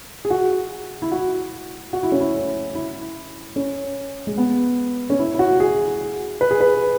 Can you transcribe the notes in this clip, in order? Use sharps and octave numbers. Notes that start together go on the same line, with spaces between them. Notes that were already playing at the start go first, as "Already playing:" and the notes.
G#4
F#4
E4
F#4
F#4
E4
C#4
E4
E4
C#4
G#3
B3
C#4
E4
E4
F#4
G#4
B4
G#4
B4